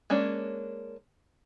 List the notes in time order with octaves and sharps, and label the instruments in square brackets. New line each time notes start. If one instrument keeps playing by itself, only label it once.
[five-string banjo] G#3 A#3 C#4 D4